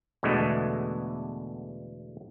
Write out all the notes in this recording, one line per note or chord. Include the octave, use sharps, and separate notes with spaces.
E2 B2 D3 E3 G#3 A3